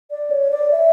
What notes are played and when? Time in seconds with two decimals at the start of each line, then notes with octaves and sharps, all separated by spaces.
0.11 D5
0.30 C#5
0.51 D5
0.71 E5